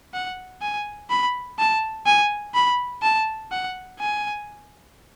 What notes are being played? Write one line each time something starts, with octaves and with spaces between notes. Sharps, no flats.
F#5
G#5
B5
A5
G#5
B5
A5
F#5
G#5